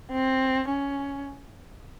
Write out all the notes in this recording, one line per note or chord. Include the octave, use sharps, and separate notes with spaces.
C4
C#4